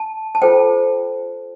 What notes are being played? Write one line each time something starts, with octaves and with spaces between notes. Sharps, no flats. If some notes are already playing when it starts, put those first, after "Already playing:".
Already playing: A5
A5
F4 A4 C5 G5